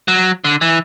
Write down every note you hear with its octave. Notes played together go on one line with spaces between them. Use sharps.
F#3
D3
E3